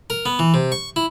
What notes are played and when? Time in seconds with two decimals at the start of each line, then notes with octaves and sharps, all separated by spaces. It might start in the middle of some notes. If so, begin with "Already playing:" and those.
0.10 A#4
0.26 B3
0.39 E3
0.54 C3
0.72 C#6
0.96 E4